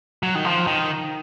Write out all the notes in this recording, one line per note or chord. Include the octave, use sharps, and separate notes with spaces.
F#3
D#3
F3
D#3